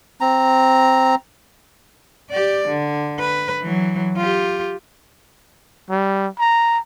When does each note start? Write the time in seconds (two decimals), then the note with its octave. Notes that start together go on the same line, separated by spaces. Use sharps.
0.21 C4 A#5
2.30 G4 D5
2.68 D3
3.20 B4
3.62 E3 F#3
4.17 F4 G4
5.90 G3
6.39 A#5